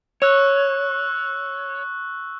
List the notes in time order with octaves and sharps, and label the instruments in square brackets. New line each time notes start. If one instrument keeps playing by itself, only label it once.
[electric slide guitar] C#5 [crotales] C#6 E6 F#6